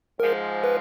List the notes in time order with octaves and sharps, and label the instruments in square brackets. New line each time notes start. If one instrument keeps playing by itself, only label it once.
[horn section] G#2 F3 G#3 [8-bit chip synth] A#4
[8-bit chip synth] B4